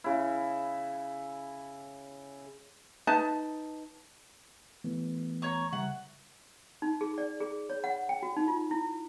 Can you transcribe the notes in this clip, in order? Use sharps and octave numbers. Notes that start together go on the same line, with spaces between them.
C#3 E4
D#4 B4 A5
E3 A3 B3
C#5 A#5 C#6
C#3 G3 E5 F#5
D#4
G#4
D5
G#4
C#5
F#5
G5
F#4
D#4
F4
E4